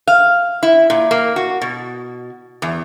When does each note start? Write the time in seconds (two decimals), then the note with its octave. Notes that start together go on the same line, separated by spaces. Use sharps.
0.07 F5
0.63 E4
0.90 A#2
1.11 A#3
1.36 F#4
1.62 B2
2.62 E2